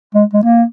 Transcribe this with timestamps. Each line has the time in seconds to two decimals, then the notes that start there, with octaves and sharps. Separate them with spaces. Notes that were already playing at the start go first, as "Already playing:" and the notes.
0.14 G#3
0.33 G#3
0.43 A#3